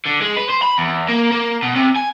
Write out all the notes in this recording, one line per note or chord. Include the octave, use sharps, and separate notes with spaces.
D3
G#3
B4
C5
B5
E2
A#3
A#3
B2
C3
G#5